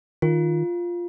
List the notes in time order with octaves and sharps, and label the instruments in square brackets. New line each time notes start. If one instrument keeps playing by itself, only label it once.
[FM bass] D#3 [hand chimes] F4